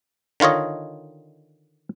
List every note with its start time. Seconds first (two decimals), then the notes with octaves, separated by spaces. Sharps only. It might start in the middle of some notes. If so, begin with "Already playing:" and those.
0.40 D3 D#3 F4 C#5 D#5